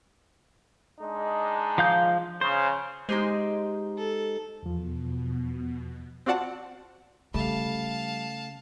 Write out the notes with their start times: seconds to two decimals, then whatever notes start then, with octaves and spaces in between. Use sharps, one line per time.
1.01 G#3 D4 D#4
1.78 F3 F5 G6
2.41 C#3 C5
3.09 G#3 D#4 G4 C5
3.98 A4
4.63 E2 B2 F3
6.26 C4 F4 F#4 D5 F#5 A5
7.34 C#3 G3 A3 F5 A5